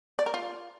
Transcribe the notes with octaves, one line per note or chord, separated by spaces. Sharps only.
D5
A#4
F4